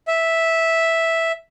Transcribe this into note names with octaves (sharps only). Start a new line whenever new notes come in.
E5